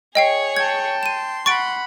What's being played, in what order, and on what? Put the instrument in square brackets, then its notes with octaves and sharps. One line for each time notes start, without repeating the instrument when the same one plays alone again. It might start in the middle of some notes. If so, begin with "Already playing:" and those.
[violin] G#4 C#5 [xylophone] D#5 G5 C7
[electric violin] G5 A5 [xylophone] G#6
[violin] C6 [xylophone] D#7 E7
[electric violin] F#5 B5 [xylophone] C#6 A6 D7